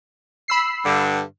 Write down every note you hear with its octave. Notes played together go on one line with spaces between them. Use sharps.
B5 E6 C7
G2 D3